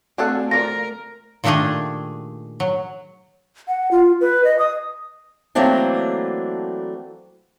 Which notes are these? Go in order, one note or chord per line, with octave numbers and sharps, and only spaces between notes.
A3 C4 D4 F#4 G#4 A4 F5 F#5
F3 A#4 D5 A#6
A#2 D#3 A3 D4 G4 G#4
F#3
F#5
F4
B4
D#5
D#6
E3 F#3 A3 A#3 C4 D4